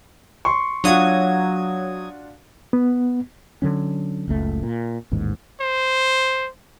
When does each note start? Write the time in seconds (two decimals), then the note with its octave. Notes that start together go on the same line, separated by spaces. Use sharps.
0.45 C6 C#6
0.84 F#3 D4 F4 F#4 D#6 G#6
2.73 B3
3.62 D3 F#3 C#4
4.28 F#1 C#2 A3
4.63 A#2
5.11 A1 D#2 G#2
5.61 C5